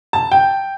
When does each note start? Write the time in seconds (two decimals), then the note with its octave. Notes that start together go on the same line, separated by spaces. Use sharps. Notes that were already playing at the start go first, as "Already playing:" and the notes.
0.13 A5
0.32 G5